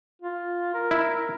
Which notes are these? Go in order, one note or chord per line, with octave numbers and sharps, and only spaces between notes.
F4
A#4
E4